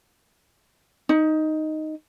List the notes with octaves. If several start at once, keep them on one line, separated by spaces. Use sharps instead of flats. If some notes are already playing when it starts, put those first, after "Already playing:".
D#4